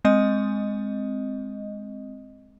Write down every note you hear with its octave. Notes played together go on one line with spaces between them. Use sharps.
G#3 C4 D#5